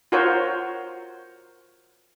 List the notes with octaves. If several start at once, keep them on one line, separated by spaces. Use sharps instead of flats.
F4 F#4 A#4 C5 C#5